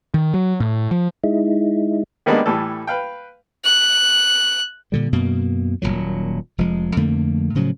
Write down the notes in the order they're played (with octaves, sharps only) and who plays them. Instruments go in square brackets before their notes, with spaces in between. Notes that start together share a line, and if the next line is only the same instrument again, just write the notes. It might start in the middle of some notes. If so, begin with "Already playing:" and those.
[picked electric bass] D#3
F#3
A2
F3
[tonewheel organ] G#3 D#4 E4
[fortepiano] D#3 G3 G#3 A#3 B3 D4
A2 E3 G3 A4
B4 F5 G5
[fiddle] F#6
[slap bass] A#2 D3 G3
F#2 B2 A#3
D#1 C2 A#2 F#3
F1 F3 G#3
F2 D3 A3 A#3
A2 C#3 F3 F#3